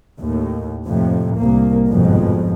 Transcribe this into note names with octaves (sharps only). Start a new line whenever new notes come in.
D#2 A2
F2 A2 C3
C2 A#3
G1 F2 G#2 B2 F3 G#3